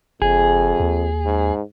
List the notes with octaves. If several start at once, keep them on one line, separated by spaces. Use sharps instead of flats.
F#1 F2 G#4
D#2
G#2